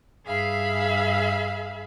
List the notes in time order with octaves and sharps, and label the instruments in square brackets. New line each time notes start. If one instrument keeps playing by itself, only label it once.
[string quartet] G2 G#4 E5 F5 B5